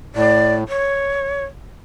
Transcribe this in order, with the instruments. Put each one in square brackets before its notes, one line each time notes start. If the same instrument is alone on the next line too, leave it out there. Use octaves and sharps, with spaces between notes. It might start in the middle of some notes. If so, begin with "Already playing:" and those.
[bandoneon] A2 [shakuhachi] D5
[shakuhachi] C#5